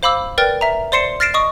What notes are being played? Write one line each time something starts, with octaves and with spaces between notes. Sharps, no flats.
C5 F5 B5 D6 E6
A#4 B4 D5 G5 F6 A6
E5 A#5
C5 D5 C6 C7 C#7 E7
F6 A6 A#6 C7 D7 E7
D#5 C#6 D#6